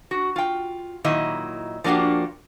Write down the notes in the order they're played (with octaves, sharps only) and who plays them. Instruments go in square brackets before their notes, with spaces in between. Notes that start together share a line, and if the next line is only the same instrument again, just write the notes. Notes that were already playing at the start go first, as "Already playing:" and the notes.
[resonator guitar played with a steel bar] F#4
F4 G5
A#2 D#3 F#3 E4 D#5
F3 A#3 D4 F#4 G4